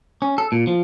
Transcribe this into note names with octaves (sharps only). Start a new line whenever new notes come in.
C#4
A4
A#2
F3